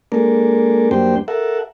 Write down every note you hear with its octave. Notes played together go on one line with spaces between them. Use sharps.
G#3 A#3 D4 A4 A#4
F#2 G3 A#3 D4 C5 G5
A4 A#4 E5 F#5